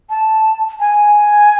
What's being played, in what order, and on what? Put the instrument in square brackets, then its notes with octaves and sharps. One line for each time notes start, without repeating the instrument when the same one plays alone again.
[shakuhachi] A5
G#5